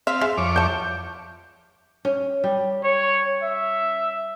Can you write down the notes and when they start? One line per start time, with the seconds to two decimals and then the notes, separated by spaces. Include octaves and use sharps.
0.07 C4 E5 F5
0.21 G#3 E5
0.37 F2 C#5 D6
0.56 E3 A5 G6
2.05 C#4
2.44 G3
2.83 C#5
3.43 E5